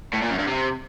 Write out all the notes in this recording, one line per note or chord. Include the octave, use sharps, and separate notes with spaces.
A2
A#2
F#2
G2
C3